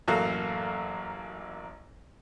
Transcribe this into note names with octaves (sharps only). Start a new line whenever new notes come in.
A1 F#2 A#3 F#4 A4 F5